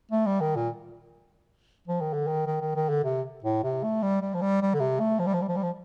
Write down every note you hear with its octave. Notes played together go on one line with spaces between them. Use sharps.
A3
G3
D#3
A#2
F3
D#3
D3
D#3
D#3
D#3
D#3
D3
C3
A2
C3
A3
G3
G3
F3
G3
G3
D3
C3
A3
F3
G3
F3
G3
F3
G3
F3